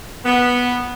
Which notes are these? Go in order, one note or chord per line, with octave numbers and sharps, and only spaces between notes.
B3